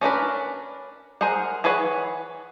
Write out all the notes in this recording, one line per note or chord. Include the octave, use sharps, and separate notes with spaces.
C#4 D4 A#4 B4
G#4 A#4 C5 F#5
E3 G#4 B4 C#5 F#5